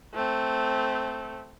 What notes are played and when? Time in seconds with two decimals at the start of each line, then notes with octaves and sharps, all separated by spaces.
0.14 A3 C4